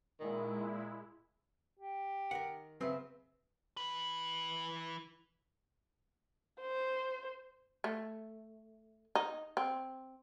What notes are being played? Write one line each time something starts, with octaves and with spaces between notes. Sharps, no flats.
A#2 D#3 G#3 E4
G4
D#3 A#4 F#5
C#3 F#3 C4 B4 E5
E3 B4
C5
A3
D#4
C4